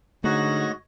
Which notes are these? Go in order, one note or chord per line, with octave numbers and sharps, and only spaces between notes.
G#2 D3 A3 F#4 C#5 D#5